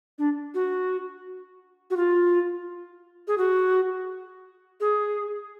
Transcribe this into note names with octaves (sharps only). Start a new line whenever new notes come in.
D4
F#4
F#4
F4
G#4
F#4
G#4